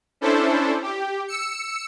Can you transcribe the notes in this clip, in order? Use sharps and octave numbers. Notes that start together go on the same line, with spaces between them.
C#4 D4 E4 A4 C5
G4
E6 C#7